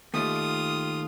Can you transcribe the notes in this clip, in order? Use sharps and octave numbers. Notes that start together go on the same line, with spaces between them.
D#2 A3 F4 D#6